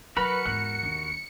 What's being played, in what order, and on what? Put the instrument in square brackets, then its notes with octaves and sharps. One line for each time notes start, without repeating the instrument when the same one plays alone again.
[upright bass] F#3 [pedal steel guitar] F#4 A#4 B5 [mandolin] B4 [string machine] C#7
[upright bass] E2 G#2 [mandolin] F#6
[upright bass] D#2 D4